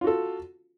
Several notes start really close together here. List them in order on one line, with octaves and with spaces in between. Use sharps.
F4 F#4 A4